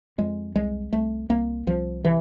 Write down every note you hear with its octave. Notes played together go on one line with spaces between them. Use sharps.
F2 G#3
C2 G#3
C2 A3
C2 A#3
C2 F3
C3 E3